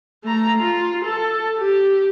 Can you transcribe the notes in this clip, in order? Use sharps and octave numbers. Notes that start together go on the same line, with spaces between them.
A3 A#5
F4
A4
G4